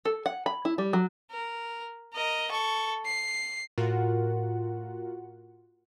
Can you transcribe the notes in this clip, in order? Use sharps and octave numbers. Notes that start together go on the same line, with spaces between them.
A4
F#5
B5
E4
G3
F#3
A#4
A#4 D#5
A4 C#6
C7
A2 F4 F#4 A#4 F#5